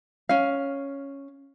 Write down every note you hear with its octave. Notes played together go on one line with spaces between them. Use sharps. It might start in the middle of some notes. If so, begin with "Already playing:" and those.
C#4 F5